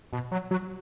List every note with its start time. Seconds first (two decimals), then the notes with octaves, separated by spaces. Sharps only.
0.13 B2
0.31 F#3
0.51 F#3